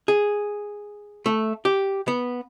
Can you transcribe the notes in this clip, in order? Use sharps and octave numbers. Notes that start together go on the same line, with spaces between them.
G#4
A3
G4
B3